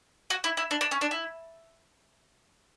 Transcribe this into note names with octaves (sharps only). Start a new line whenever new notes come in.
F#4
E4
E4
D4
D4
C#4
D4
E4